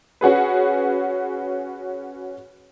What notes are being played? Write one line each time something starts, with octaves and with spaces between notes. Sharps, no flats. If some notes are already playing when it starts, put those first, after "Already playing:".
C#4 F#4 G#4 B4